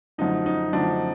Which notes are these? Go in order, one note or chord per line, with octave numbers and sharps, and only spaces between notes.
F#2 D3 F3 A3 D#4
D#4
F#2 D3 F3 A3 D4